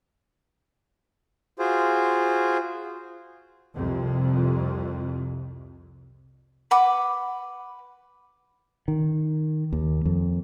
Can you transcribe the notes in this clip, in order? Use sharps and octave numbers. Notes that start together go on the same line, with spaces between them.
F4 F#4 G#4 C5
C2 F2 C3
B4 F#5 B5 D6
D#3
D#2
F2